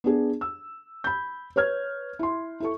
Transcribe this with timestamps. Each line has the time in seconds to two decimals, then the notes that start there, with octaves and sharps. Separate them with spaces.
0.04 B3 D4 G#4
0.41 E6
1.04 B5 G6
1.56 B4 C#5 F6 G#6
2.19 E4 C6
2.60 E4 A4 C#6